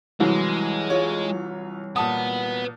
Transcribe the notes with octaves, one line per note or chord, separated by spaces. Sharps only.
C2 E3 F#3 G#3
F4 C#5
A#2 B4 F#5 A5 D#6